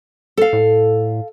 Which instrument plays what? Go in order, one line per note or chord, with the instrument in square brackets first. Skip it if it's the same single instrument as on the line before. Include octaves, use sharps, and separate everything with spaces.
[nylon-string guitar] A4 F5
[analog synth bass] A2